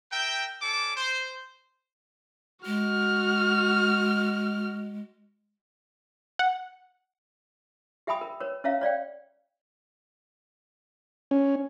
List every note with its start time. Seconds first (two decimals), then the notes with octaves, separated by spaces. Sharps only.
0.12 A#4 E5 G5
0.61 C#4 D4 A4 D6
0.96 C5
2.66 G#3 F#4 F6
6.39 F#5
8.07 G4 E5 G5 G#5 B5 D#6
8.21 A#4
8.40 A#4 B4 C#5
8.64 C#4 C#5 E5 F5 A#5
8.81 C#5 D5 F5 G5
11.31 C#4